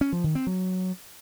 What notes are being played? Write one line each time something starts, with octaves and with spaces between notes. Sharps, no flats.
C#4
F3
D#3
C4
F#3